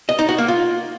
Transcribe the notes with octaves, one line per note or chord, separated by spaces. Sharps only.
D#5
D#4
F#4
A#3
F4